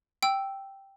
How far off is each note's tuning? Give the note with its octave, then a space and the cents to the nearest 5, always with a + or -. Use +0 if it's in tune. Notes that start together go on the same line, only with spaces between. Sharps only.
G5 +0 E6 +0